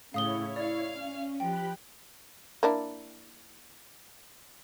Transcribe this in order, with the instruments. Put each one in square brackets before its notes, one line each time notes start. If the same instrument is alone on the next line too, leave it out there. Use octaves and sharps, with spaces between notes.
[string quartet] A2 C#3 [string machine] E4 C#5 [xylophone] F5 D#6 G7
[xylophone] D5 [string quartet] F5 F6
[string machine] C#4
[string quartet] F3 [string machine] G4 B5 F#6 [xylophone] G5
[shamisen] A#3 D4 E4